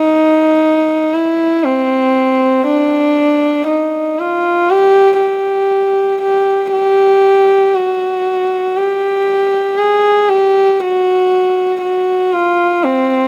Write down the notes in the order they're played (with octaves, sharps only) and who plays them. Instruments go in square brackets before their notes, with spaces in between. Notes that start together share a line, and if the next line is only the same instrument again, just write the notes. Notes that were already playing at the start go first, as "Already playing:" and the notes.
Already playing: [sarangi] D#4
E4
C4
D4
D#4
F4
G4
G4
G4
G4
F#4
G4
G#4
G4
F#4
F#4
F4
C4